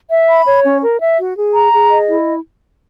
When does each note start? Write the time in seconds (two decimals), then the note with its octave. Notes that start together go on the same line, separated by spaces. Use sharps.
0.10 E5
0.28 B5
0.46 C#5
0.64 C#4
0.82 A#4
1.00 E5
1.18 F#4
1.37 G#4
1.54 A#5
1.72 G#4
1.91 D#5
2.09 E4